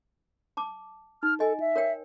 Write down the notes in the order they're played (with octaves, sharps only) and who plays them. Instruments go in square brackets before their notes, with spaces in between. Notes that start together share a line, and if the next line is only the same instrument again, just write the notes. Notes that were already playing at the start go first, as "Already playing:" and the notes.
[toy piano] A5 D6
[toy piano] D#4 [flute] F6
[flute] A4 [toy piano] D#5 G#5
[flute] E5
[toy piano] A#4 C#5 G5